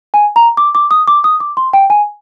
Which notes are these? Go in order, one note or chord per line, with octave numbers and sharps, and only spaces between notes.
G#5
A#5
D6
D6
D#6
D6
D#6
D6
C6
G5
G#5